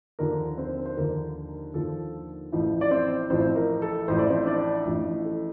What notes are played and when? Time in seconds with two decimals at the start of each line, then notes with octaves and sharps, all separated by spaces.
0.19 D#2 D3 F3 A#4
0.57 C4 C5
0.86 C5
0.97 D#2 D3 F3 A#4
1.74 D#2 D3 F3 A4
2.52 A1 A2 F3
2.81 D5
2.91 C4 C5
3.30 A1 A2 F3 C4 C5
3.56 A#4
3.82 A4
4.08 A1 A2 F3 C5
4.19 D5
4.30 C4 C5
4.46 D4 D5
4.86 A1 A2 F3
5.25 A4